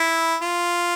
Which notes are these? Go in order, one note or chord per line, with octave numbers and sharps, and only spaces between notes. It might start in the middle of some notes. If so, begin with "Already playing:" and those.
Already playing: E4
F4